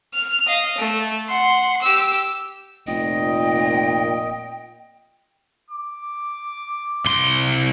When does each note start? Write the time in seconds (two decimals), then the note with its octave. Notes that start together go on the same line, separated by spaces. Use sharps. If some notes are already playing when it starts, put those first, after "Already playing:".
0.14 F6
0.47 D#5 F5
0.78 A3
1.29 F#5 C6
1.82 G4 E6
2.87 F1 A#2 D#5 G5
5.70 D6
7.06 C2 C6